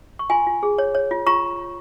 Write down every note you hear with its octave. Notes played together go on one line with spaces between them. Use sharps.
C#6
F4 G#5 C6
F4
G#4
C#5
C#5
F4
F4 A#5 C#6